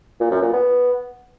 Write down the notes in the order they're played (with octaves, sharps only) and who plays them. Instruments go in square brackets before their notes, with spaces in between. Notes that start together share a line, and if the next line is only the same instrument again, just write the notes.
[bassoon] A#2
F#2
A#2
B3